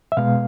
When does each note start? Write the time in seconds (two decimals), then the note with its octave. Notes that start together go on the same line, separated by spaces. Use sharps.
0.12 E5
0.17 B2 G#3 B3 F5